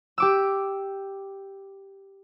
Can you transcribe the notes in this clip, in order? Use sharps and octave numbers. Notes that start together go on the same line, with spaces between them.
G4 D6 E6